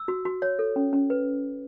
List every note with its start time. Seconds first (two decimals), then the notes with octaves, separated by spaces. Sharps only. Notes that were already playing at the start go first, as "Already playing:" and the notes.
Already playing: E6
0.08 F#4
0.25 F#4
0.42 C#5
0.59 A4
0.76 C#4
0.93 C#4
1.10 B4